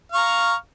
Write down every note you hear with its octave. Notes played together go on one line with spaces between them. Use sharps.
F5 A#5 C#6